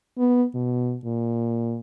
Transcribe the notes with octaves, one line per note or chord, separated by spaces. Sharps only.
B3
B2
A#2